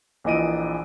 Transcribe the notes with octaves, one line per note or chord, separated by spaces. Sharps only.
A#1 A#2 E3 D#5 D7 D#7